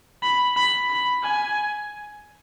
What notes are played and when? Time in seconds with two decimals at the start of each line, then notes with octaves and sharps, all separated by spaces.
0.23 B5
0.57 B5
0.90 B5
1.23 G#5